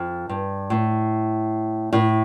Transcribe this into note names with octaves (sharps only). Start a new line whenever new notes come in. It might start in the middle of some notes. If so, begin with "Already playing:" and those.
Already playing: F2
G2
A2
A2